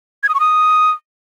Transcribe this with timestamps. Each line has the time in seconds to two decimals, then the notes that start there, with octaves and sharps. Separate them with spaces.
0.23 G#6
0.29 D#6
0.34 C#6
0.40 D#6